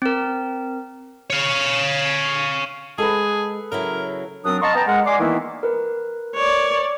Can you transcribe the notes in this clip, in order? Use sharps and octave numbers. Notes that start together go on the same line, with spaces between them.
C4 A#4
C#5 F5
G#3 G#4 A4 B4
C#3 F#3 E4 A#4
F#2 F#3 C4 D4 A#4 D#6
D#5 F5 A5 A#5 C6 C#6
B3 G5 A5 A#5
G#3 A#4 F#5
D5 D#5 G#5 C6 D6
D#3 E3 A#3 B3 E4
A#4 B4
C#5 D5